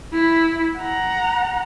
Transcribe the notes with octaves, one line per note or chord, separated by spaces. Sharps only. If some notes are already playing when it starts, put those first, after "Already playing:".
E4 B5
F#5 A#5